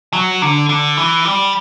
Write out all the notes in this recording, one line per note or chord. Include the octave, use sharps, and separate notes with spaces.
F#3
D3
D3
E3
G3